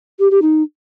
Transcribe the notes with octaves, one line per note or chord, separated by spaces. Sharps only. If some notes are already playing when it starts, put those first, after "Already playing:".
G4
G4
D#4